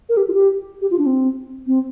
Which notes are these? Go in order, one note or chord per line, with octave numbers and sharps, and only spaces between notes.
A#4
G4
F4
G4
G4
F4
D4
C4
C4